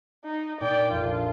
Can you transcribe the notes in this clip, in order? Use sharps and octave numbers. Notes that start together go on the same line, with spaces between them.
D#4
A#2 D#4 D5 G5
A#1 F2 F4